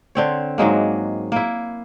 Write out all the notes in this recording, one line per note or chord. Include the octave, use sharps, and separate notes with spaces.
D3 C4 C#5
G#2 F#3 G#3 A#3
A#3 E4